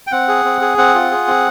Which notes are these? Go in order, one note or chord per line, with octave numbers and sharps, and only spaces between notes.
G5
C4 F#5
G#4
C4
G#4
C4 F#5
F4
G#4
C4